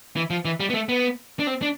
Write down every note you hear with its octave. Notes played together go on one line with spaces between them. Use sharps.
E3
F3
E3
G3
B3
A3
B3
D4
C4
D4